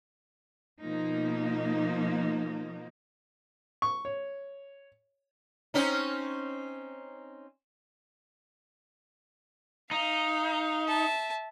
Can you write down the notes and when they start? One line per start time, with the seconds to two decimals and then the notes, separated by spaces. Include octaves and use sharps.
0.80 B2 F3 A#3 D#4
3.82 C#6
4.05 C#5
5.74 C4 C#4 D#4
9.91 D#4 F5
10.87 E5 A5